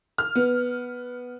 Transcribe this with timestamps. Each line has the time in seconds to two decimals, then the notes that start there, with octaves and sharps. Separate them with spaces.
0.18 F6
0.35 B3